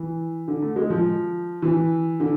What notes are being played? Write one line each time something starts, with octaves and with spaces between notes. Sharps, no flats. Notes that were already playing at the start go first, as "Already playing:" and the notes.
Already playing: E3
D3
A3
G#3
F3
E3
D3